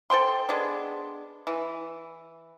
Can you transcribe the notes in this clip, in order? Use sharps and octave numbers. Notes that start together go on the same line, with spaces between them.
A4 C5 G5 C6
G#3 B3 D4
E3